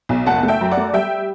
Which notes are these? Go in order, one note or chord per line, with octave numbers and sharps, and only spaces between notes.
B1
F#1 F#5 A5
A3
E5 G5
F#2
D5 F#5
A3
G3 E5 G5